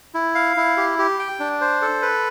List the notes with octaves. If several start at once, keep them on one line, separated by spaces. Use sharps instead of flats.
E4
F5
E4
G4
G4
G5
D4
C5
A4
B4